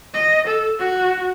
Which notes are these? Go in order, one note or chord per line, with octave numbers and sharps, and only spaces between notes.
D#5
A4
F#4